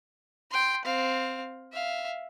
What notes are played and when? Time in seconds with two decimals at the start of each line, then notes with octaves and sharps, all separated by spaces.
0.51 G5 C6
0.85 C4 F5
1.72 E5 F5